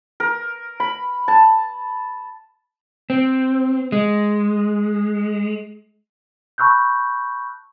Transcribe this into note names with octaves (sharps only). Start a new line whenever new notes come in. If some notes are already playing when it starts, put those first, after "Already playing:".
A#4
B5
A5
C4
G#3
A5 B5 C#6 E6 F#6 G6